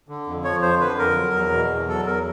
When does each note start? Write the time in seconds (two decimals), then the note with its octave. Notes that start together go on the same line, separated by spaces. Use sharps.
0.09 D3
0.27 F2
0.44 F3 C#5
0.62 F2 C5
0.80 D3 B4
0.98 F2 A#4
1.16 F#3
1.34 E2
1.52 B2
1.70 E2
1.88 F#3 A4
2.06 E2 A#4